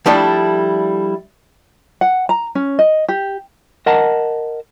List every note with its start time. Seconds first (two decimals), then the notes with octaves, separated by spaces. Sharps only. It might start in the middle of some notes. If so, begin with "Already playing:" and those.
0.06 F3 G3 A3 D4 E4 A4
2.01 F#5
2.29 A#5
2.55 C#4
2.79 D#5
3.09 G4
3.86 A#4 D#5 F#5 A5 A#5